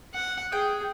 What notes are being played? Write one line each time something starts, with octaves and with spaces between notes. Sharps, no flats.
F#5
G#4 G5